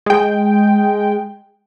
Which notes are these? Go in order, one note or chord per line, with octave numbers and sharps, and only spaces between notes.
G#3 G5